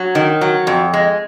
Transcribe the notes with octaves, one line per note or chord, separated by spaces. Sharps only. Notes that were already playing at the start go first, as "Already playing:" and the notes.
Already playing: F#3
D#3
F#3
F2
G#3